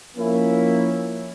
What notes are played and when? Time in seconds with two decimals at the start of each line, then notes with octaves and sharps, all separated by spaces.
0.17 F3 A#3 C#4 E4